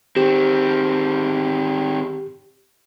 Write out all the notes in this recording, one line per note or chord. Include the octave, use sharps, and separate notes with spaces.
D#3 C4 G4